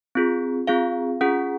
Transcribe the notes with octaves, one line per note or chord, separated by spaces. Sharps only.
C4 F4 G#4
C4 F4 G#4 F5
C#4 F4 G#4 F#5